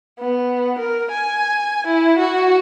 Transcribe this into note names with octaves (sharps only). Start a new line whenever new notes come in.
B3
A#4
G#5
E4
F#4